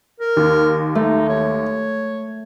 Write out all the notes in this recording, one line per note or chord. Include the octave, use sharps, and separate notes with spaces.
A#4
D#2
A3 D#4
C#5